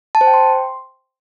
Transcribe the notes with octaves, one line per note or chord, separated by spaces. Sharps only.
A5
C5
G5
C6